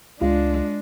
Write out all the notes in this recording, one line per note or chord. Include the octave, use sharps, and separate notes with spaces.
C#2 G#3 D4 F4